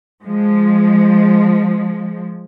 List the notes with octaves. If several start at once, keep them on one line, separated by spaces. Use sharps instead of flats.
F3 G#3